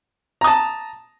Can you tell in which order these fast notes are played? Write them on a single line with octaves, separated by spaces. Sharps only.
A#5 D#6 A5